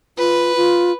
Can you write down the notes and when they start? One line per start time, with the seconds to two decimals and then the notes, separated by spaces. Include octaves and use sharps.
0.18 F4 B4
0.56 F4